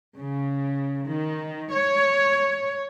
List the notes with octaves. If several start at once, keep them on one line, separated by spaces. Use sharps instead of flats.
C#3
D#3
C#5